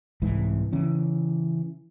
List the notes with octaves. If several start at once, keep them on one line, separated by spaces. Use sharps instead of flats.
C2 G#2 E3
C#3 E3 C#4